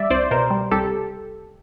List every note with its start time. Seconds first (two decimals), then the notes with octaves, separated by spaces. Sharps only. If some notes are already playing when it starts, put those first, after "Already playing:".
Already playing: G3 D5 E5
0.10 C2 C5 D5
0.31 B2 A#4 C5
0.50 G3
0.71 C2 G4 A4